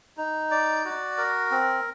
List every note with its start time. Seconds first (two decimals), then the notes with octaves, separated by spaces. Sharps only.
0.17 D#4
0.51 D5
0.85 F#4
1.17 A#4
1.51 C4